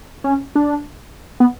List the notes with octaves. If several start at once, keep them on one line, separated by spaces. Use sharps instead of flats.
C#4
D4
B3